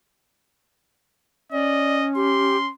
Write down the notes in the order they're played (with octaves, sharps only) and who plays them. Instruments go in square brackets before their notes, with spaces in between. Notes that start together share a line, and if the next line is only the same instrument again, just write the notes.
[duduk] C#4 [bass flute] D5 [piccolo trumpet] D#5
[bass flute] G4 [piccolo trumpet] C6